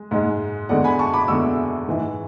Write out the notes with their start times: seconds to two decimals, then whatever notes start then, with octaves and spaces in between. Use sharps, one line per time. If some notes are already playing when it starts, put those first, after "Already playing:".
Already playing: G#3
0.11 G#2 G#3
0.69 E2 D3 G#3 D5 F#5
0.84 G#5 B5
0.99 A5 C#6
1.13 B5 D6
1.28 E2 D3 G#3 C#6 E6
1.88 G#2 E3 G#3